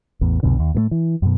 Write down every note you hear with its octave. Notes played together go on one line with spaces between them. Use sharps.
A1 E2
C2 F2 B2 D3
D#2
A2 F#3 A3
E3
F#2 B2